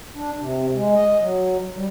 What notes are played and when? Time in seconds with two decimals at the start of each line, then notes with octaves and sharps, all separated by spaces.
0.15 D4
0.40 C3
0.75 G#3
0.94 D#5
1.20 F#3
1.75 G3